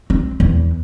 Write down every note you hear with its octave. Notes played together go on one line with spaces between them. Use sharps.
C4
E2